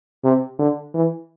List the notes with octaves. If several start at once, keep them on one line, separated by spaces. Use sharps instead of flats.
C3
D3
E3